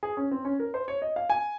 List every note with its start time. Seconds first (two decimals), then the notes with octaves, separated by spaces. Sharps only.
0.03 G#4
0.17 C#4
0.31 C4
0.45 C#4
0.60 A#4
0.74 C5
0.88 C#5
1.02 D#5
1.16 F5
1.30 G#5